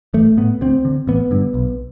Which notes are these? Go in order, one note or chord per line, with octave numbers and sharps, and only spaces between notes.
A1 A3
A2 B3
D2 C4
D3
A1 B3
G2 D3
B1